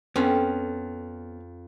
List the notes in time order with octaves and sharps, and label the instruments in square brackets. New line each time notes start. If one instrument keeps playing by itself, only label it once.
[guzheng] F2 [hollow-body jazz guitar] B3 C#4